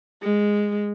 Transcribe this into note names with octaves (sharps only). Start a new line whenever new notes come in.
G#3